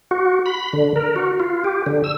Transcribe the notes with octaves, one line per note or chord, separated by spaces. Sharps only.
F#4
B5
D3
A#4
F#4
F4
G4
D3
E6